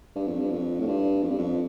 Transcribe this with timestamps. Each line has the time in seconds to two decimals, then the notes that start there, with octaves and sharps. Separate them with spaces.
0.15 G2
0.27 F2
0.39 G2
0.51 F2
0.80 A2
0.87 G2
1.23 F2
1.30 G2
1.38 F2